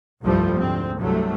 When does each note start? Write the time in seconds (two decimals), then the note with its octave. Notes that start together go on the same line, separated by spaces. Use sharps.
0.22 F1 C2 G2 F3 G3 A3
0.55 D2 G#2 C4
0.98 C2 G2 C3 F#3 G3 A3